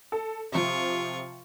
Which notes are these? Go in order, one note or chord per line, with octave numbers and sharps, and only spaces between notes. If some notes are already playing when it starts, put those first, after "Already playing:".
A4
C3 F3 F4 C#6